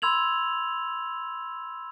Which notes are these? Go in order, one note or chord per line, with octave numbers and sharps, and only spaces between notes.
B5 C6 E6 G#6 F7 F#7